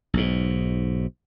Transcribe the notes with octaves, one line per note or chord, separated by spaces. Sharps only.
B1 G#2